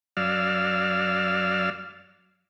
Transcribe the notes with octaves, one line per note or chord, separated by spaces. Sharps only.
F#2 F#3 D5 F5 E6 F6